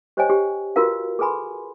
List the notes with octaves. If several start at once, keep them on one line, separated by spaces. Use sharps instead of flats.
G4 C5 C#5 D#5 G5 G#5
G4
F4 F#4 A#4 B4 F5
G#4 A4 B4 G#5 B5 C6